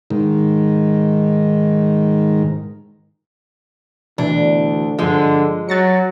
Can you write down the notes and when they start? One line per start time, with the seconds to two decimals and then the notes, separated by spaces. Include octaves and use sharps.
0.10 G#2 D#3
4.18 D2 B2 E3 D4
4.99 G2 D3 F3 G#3
5.69 F#3 A6 A#6 C#7